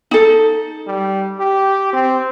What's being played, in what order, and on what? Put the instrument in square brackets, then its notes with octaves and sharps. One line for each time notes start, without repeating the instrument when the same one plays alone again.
[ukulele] D#4 A4
[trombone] G3
G4
C4